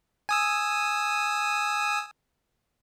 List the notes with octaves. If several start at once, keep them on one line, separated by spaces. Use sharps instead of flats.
G#5 D#6 E6